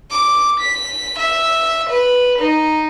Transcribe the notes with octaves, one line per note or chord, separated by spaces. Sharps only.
D6
B6
E5
B4
D#4